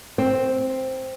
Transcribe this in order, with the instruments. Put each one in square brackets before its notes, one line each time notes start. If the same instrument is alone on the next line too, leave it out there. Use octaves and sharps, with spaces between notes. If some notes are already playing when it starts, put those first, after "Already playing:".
[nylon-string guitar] C4